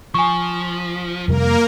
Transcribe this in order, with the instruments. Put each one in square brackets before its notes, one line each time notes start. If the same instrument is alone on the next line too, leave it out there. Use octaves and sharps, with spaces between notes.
[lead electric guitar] F3 [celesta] G#5 C#6
[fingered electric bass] F2 C3 G3 [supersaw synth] A#3 A#4